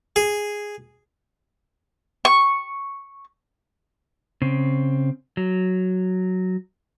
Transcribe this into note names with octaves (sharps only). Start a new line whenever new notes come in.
G#4
C#6
C#3 C4
F#3